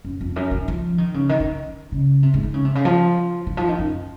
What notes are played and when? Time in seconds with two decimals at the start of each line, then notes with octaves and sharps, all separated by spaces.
0.05 F#2
0.21 F2
0.36 F#2
0.51 D#3
0.68 F3
0.98 D#3
1.14 C#3
1.29 D#3
1.40 D#3
1.92 C#3
2.23 C3
2.34 G#2
2.43 D#3
2.54 C#3
2.65 C3
2.75 C#3
2.85 F3
3.47 D#3
3.57 F3
3.69 D#3
3.79 F#2